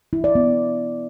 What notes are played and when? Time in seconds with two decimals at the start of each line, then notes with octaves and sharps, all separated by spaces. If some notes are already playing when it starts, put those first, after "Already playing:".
0.13 E4
0.24 D5
0.35 B3